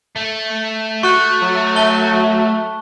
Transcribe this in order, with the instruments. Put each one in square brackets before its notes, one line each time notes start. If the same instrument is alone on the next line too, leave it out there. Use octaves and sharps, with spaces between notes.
[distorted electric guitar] A3
[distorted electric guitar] A3 [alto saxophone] F#4 [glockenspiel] C#6 F#6
[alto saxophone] F#3
[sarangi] E5 [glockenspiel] A5 G7